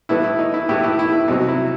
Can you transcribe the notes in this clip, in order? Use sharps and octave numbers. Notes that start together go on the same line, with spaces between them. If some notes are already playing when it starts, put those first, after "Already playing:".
A2 E3 G3 B3 E4
E4
D#4
E4
A2 E3 G3 B3 E4 G4
E4 G4
E4
E4
C2 C3 F#3 C4 D#4
E4